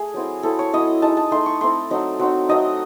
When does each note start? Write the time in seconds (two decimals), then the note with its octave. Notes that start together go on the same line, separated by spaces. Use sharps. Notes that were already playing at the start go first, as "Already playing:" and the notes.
Already playing: A3 G#4
0.14 F#3 C4 E4
0.43 F#3 C4 E4 A4
0.59 C#5
0.73 F#3 C4 E4 D#5
1.02 G#3 D#4 A5
1.17 A5
1.31 A3 D#4 C6
1.46 C#6
1.61 A3 C4 E4 C6
1.90 F#3 A3 C4 D#4
2.19 F#3 C4 D#4
2.49 F#3 A3 C4 D#4 D#5